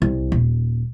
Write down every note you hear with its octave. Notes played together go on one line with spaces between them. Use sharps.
C2
D#1